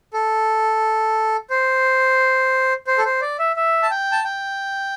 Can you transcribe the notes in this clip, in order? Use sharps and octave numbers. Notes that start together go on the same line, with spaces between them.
A4
C5
C5
A4
C5
D5
E5
E5
A5
G5
A5
G5